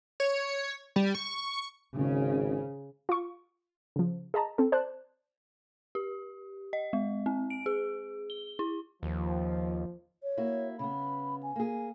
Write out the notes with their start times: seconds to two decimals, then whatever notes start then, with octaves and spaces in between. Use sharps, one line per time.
0.20 C#5
0.96 G3
1.15 C#6
1.97 G#1 C#3
3.09 F4 C#6
3.96 C#3 F3
4.34 G#4 D#5 A5 A#5
4.58 C4 A4
4.72 C5 D5 A5 F#6
5.95 G4
6.73 D#5
6.93 G#3
7.26 C4
7.50 D7
7.66 G#4
8.30 G7
8.59 E4
9.03 D#2 F3
10.23 C#5
10.37 A#3 E4 F#4
10.79 C#3 B3 B5
11.43 G#5
11.56 A#3 G#4